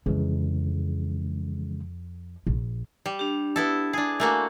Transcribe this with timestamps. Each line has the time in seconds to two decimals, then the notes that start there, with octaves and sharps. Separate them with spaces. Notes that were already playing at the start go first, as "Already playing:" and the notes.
0.06 F2 C#3 E3 G#3
2.47 A#1
3.06 G3
3.19 D4 G4
3.56 B3 E4 A4
3.93 D4 G#4
4.20 A3 A#3 F#4 G#5